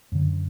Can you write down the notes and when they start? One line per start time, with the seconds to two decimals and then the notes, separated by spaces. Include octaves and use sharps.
0.12 F#2 D3